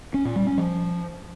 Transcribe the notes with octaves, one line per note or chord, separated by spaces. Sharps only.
C#4
A#2
G3
C#4
F3